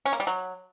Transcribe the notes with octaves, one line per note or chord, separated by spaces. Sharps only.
C#4
A#3
G3
F#3